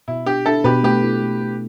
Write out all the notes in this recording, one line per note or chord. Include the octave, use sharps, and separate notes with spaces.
B2 E4
D4 G4
D4 E4 A4
B2 G4 B4
A3 G4 B4
E4
A3
A3